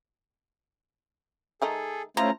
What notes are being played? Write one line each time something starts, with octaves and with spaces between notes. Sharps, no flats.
D#3 A3 D#4 G#4 A4
F3 A3 C#4 E4 F4 C5 A#5